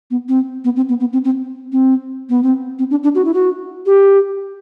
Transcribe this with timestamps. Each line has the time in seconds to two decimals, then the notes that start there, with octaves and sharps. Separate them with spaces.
0.11 B3
0.29 C4
0.64 B3
0.76 C4
0.89 B3
1.00 B3
1.13 C4
1.24 C4
1.72 C4
2.29 B3
2.43 C4
2.79 C4
2.90 D4
3.03 D4
3.15 F#4
3.25 E4
3.34 F#4
3.86 G4